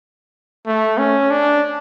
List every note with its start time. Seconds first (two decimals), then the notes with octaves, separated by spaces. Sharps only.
0.66 A3
0.98 C#4
1.30 D4